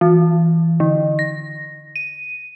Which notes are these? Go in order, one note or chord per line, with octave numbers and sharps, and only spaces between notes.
E3
D3
A#6
D#7